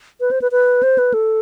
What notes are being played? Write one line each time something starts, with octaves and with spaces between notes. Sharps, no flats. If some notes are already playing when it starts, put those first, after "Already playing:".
B4
C5
B4
B4
C5
B4
A4